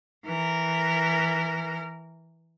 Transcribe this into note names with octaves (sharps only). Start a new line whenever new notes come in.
E3 A#4